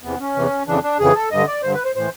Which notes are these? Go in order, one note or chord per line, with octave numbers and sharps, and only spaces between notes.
E2 C3 E3 B3
C#4
E2 C3 E3
F2 C#3 E3 D4
D4
F2 C#3 E3 G#4
A4
G2 D3 D#5
D5
G2 D3 C5
B4
C5
A2 E3 C5